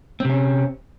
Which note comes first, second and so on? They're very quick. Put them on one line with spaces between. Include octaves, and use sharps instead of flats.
C4 C3 C#4